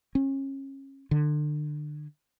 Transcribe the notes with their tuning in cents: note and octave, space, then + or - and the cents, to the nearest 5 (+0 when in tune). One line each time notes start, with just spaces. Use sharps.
C#4 -30
D3 +30